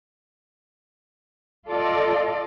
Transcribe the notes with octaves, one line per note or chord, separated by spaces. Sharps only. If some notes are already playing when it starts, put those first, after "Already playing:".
F4 A4 D5 D#5